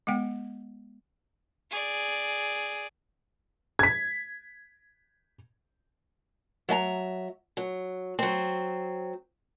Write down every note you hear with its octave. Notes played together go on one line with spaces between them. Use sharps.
G#3 B3 G5
G#4 D5
G#6 B6
F#3 E5 A5 A#5
F#3
F#3 C4